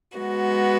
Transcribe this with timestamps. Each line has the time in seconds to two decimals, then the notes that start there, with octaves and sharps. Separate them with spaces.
0.17 G#3 B3 F#4